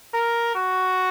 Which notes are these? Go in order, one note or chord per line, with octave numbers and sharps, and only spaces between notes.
A#4
F#4